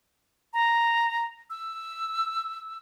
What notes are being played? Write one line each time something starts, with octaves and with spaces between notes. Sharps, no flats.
A#5
E6